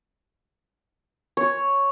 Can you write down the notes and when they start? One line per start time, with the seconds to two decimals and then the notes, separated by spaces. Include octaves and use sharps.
1.37 C#5